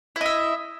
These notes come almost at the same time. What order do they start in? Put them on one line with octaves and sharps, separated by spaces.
E4 D#5 E5